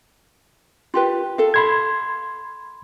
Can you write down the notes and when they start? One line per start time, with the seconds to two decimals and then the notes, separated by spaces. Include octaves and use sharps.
0.94 F4 G4 B4
1.38 A4 F5
1.54 B5 C6 G#6